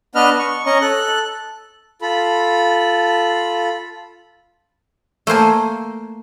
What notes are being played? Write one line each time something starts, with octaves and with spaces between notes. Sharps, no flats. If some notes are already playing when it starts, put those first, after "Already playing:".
B3 D4 B4 D#5 F6
C#6
C#4 D#5 A#5 C#6
A4 F#6
F4 A4 B5
A3 A#3 C5 G#5